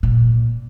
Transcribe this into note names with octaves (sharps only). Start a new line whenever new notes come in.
A#2